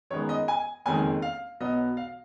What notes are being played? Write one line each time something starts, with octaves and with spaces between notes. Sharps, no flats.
F#2 D#3 G#3 B3 C#5
D#5
G#5
F#1 F2 D#3 G#3 G#5
F5
B1 B2 F#3 B3 D#5
F5